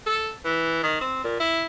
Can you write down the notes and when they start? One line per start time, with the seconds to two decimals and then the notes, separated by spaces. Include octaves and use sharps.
0.06 A4
0.45 E3
0.83 D#3
1.01 C4
1.24 A#2
1.40 E4